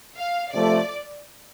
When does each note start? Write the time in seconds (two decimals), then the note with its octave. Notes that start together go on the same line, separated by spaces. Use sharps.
0.16 F5
0.53 C3 F3 A3 D5